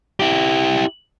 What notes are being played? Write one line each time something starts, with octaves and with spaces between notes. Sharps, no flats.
E4 G4